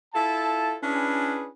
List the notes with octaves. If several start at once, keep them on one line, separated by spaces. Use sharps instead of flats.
E4 F4 A4 A5
C#4 D4 E4 G#4 B4